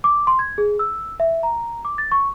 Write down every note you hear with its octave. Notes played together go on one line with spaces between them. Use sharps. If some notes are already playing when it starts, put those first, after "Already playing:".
D6
C6
G#6
G#4
E6
E5
A#5
D6
A6
C#6